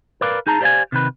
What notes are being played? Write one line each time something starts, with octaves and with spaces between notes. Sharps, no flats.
A#4 B4 D5 F5
D#4 G#4 A5 A#5
G4 C5 D5 D#5 F5 G#5
C3 D#3 B4